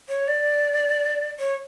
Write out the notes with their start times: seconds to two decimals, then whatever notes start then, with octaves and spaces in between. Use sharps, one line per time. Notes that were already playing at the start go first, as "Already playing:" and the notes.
0.09 C#5
0.28 D5
1.39 C#5